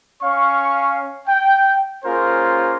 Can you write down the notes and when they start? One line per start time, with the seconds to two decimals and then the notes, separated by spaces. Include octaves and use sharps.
0.22 C#4 C#5 F5 C#6
1.27 G5
2.04 A#3 C#4 F4 G#4 A#4 C5